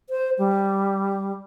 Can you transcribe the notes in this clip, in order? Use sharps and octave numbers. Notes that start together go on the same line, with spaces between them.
C5
G3